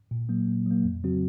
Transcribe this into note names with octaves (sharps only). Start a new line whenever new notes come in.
A#2
F#3 A#3
A#2
F#3 A#3
F2
C#3 F#3 C4 F#4